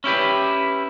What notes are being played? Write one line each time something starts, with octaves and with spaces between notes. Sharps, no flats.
C#4 E4 G4 B4